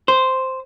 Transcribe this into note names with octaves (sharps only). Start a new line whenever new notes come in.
C5